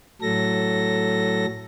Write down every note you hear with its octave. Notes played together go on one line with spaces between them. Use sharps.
A2 F#3 A4 A#6